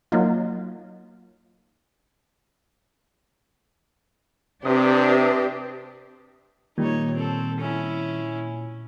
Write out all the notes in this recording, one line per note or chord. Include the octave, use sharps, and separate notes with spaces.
F#3 A#3 D#4 F4
C3 C4 D4 G4 B4 D#6
A#2 D#3 G3 D#4 C#5
C4 A4
C#4 E4